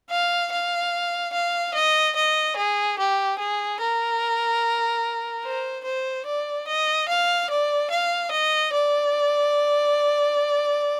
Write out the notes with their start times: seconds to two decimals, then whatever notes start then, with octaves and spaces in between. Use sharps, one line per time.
0.11 F5
0.52 F5
1.33 F5
1.74 D#5
2.16 D#5
2.57 G#4
2.99 G4
3.39 G#4
3.81 A#4
5.45 C5
5.85 C5
6.26 D5
6.68 D#5
7.09 F5
7.50 D5
7.91 F5
8.31 D#5
8.73 D5